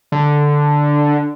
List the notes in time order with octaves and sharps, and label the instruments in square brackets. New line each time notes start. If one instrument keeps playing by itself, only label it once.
[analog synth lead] D3